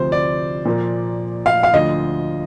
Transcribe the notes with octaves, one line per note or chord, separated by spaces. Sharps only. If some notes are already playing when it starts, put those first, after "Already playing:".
Already playing: D2 C3 F3 C5
D5
A#2 F3 A#3
F5
F5
D2 D3 F3 D#5